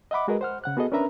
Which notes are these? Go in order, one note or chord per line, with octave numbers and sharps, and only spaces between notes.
D#5 E5 F#5 B5 D6
G#3 F#4 G#4 A#4 B4 D#5
C5 F#5 F6
C#3 F#5 F#6
B3 F#4 G#4 A4 D#5
C#4 D4 A#4 B4 E5 A#5